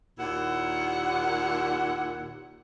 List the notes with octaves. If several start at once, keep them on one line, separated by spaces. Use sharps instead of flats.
D#2 A#2 E4 F#5